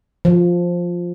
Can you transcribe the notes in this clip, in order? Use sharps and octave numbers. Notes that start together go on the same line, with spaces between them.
F3